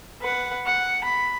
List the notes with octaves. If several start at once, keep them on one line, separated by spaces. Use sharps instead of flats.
B4 F#5
F#5
B5